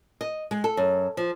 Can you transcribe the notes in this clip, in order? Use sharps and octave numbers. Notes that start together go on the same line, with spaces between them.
D#5
G#3
A4
F#2
F3